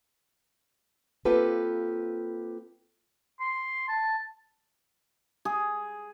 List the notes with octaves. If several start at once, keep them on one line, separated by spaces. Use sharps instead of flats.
A#3 C4 F4 G4 A4 B4
C6
A5
G#4